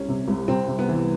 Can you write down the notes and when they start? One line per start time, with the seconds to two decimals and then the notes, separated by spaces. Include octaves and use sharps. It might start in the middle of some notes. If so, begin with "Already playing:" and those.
Already playing: C2 C#4
0.09 C3
0.28 C2
0.48 C3 C4
0.68 C3
0.79 B3
0.89 E3